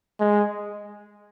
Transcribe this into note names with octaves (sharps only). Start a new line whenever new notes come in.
G#3